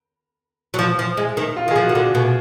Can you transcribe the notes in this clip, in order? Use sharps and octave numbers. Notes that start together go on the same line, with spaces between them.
F#3
F3
F3
G#3
D#3
F4
D#3
F3 G#4
F#4
D#3
D3
B2